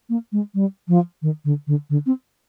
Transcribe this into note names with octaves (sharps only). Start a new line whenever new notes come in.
A#3
G#3
G3
F3
D#3
D3
D3
D3
C4